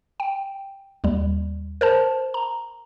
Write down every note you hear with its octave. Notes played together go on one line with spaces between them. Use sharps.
G5
D#2 G3
A#4 C5 A5
A#5